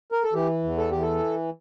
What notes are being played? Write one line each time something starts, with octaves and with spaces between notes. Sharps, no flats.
A#4
A4
E3 G4
E2
A4
E3 G4
A4